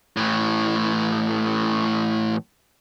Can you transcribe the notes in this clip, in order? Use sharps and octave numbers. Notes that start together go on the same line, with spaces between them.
A2 E3